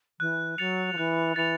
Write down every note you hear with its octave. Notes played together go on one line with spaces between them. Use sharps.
E3 F#6
F#3 A6 C#7 F7
F3
E3 F#6
E3 A6 C#7 F7